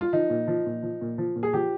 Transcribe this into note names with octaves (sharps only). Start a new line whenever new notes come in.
F4
F3 D#4
A#2
F3
A#2
F3
A#2
F3
A#2
G#4
F3 G4